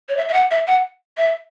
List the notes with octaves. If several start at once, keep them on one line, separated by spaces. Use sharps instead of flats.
C#5
E5
E5
F#5
E5
F#5
E5